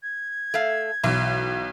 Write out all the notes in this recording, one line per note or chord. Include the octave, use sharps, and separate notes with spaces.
G#6
A3 F5
B1 E3 F#3